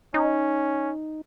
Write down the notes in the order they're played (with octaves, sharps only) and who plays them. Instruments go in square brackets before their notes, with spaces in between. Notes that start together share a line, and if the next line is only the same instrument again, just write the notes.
[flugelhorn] C#4 [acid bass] D#4